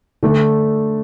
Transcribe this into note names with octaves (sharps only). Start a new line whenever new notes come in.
D3 A3 D4 A4